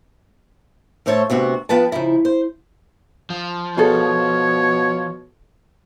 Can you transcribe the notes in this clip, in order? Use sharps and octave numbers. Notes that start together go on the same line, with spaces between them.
A2 A3 C5 C#5 E5 A5
D2 C3 B3 F#4
F3 B3 B4 G5 A5
C#3 F3 D#4 E4
C5
F3
B2 F4 G#4 A4 C#5